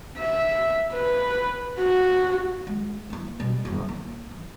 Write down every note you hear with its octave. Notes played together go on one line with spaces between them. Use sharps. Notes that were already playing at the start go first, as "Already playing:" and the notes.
E5
B4
F#4
G#3
E3 A#3
B2 G3
F#1 E2
A#3
E3